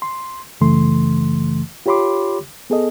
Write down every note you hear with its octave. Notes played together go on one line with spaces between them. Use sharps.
C6
F#2 C#3 E3 A3 C6
F4 G4 C#5 B5 C6 D6
B3 G#4 A4 D#5